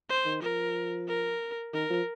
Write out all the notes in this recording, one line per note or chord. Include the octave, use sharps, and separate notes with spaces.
C5
D#3
F3 A#4
A#4
D#3 A#4
F3